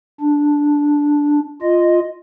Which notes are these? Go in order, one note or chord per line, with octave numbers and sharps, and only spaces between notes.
D4
F4 D#5